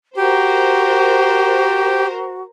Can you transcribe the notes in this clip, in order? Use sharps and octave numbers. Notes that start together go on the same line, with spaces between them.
F#4 G4 A#4 C5